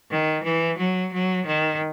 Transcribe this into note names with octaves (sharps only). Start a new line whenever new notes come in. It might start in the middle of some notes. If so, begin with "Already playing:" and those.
D#3
E3
F#3
F#3
D#3